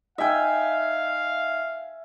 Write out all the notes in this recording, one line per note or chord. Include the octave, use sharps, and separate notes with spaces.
D#4 E5 F5 G5 G#5